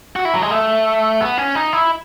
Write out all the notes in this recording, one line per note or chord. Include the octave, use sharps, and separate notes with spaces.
F#4
E4
F#3
G#3
A3
B3
C#4
D#4
E4